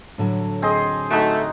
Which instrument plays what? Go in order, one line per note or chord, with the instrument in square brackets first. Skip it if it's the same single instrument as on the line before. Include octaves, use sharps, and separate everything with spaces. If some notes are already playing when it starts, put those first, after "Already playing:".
[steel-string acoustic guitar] A2 D3 F#3
[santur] C4 G#4 D#5
[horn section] A3 [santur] D#4 F#4